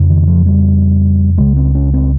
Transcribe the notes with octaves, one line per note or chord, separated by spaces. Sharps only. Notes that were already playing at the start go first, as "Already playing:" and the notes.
Already playing: F2 C#3
D#3
F3
G3
C#2 C#3 G#3
C4
C#4
C4